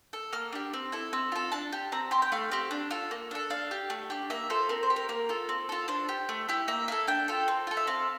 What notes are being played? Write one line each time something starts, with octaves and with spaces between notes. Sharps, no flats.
A4
A#3 F6
D4 G4
C4
E4 A4
C4 E6
F4 A4
D4 A5
G4
C4 A#5
G4 C6
G5
A3 F5
C4 G4
D4
F4 A4
A#3
D4 A4
D4 F5
G4
A3
D4 G4
A#3 E5
F4 A4 C5
C4 A#4
C5
G4
A#4
A#3 A#4
F4 A4
C4
F4 A4
D4 C5
G4
A3
E4 G4
A#3 E5
E4 A4 F5
D4 G5
F4 A4
C4
F4 A4
E5
C4 F5